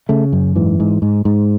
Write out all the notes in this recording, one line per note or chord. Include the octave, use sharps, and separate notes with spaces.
C#3 A3
F#2
G#2 E3
G#2
G#2
G#2